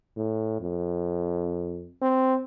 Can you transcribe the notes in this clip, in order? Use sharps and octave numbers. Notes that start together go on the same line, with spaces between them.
A2
F2
C4